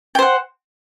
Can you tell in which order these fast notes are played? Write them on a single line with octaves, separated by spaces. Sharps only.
G5 C5 F#5